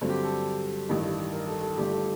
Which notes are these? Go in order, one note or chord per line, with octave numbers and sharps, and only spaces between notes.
G2 D3 F#3 C4
G4
A4
A1 G2 D#3
A#4
A4
A4
G1 G2 D3 A3 G4
A4